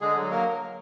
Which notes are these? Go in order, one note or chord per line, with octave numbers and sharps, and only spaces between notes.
D3 G#3 G#4
F#3
A#3 A#4